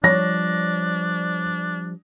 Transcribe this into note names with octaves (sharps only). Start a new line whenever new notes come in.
F3 G3 D4 C#5 A#6